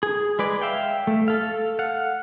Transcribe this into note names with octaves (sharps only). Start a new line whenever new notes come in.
G#4
G#3 B4 D5
E5 F5 G5
A3
A4 F5
F5 F#5